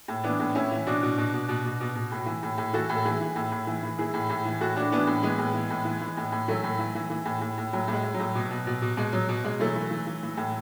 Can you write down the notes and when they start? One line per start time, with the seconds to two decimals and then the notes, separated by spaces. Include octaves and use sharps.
0.08 A2
0.24 E3 B3 D4
0.40 A2
0.55 A2 C#4 E4
0.72 E3
0.87 B2 D4 F#4
1.02 B2
1.18 B2
1.33 B2
1.49 B2
1.65 B2
1.81 B2
1.96 B2
2.12 A2
2.26 E3
2.43 A2
2.58 A2
2.73 E3 F#4 A4
2.89 A2
2.96 A4
3.05 E3 E4 G#4
3.21 E3
3.36 A2
3.52 A2
3.67 E3
3.83 E3
3.98 E3 E4 G#4
4.14 A2
4.30 A2
4.45 E3
4.61 A2 F#4 A4
4.76 A2 D4 F#4
4.92 E3 B3 D4
5.07 A2
5.23 E3 G#3 B3
5.39 A2
5.54 E3
5.70 A2
5.85 E3
6.01 E3
6.17 A2
6.32 A2
6.48 E3 F#3 A3
6.64 A2
6.79 E3
6.95 E3
7.10 E3
7.26 A2
7.41 A2
7.58 A2
7.73 A2 F#3
7.88 A2
7.93 G#3
8.03 A2
8.14 F#3
8.20 A2
8.35 B2
8.51 B2
8.67 B2
8.82 B2
8.97 B2 G#3
9.13 B2 F#3
9.29 B2
9.44 B2 G#3
9.60 E3 F#3 A3
9.76 E3
9.91 E3
10.07 E3
10.23 E3
10.37 A2